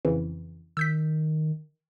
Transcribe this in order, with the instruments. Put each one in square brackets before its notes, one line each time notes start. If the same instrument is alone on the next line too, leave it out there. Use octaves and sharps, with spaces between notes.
[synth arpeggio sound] F2 C#3 E3
[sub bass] D#3 [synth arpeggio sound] E6 G6 B6